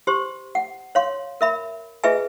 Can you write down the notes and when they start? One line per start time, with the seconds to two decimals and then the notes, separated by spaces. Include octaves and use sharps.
0.07 G4 C5 C6
0.55 F#5
0.95 C#5 F5 C6
1.41 A#4 E5 B5
2.04 F4 G#4 B4 D#5 E5 G#5